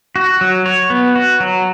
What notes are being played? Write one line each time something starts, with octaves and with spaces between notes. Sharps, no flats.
F#4
F#3
C#5
B3
F#4
F#3